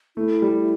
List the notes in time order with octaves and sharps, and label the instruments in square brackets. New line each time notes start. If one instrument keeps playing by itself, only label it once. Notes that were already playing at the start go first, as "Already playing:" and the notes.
[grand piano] A3 [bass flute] E4
[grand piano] G3